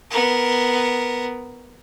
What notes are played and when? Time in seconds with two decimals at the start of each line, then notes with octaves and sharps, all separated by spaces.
0.10 B3 A#4